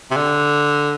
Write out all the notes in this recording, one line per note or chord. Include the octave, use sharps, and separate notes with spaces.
C3
D3